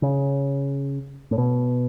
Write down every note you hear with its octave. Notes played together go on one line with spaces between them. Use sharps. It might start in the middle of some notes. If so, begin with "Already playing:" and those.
C#3
A2
B2